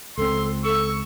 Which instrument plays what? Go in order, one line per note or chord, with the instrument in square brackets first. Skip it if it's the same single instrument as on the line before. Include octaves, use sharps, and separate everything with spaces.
[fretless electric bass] C#2 A3 C4 [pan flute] A4 [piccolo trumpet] C6
[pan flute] A4 [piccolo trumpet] C#6 [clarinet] E6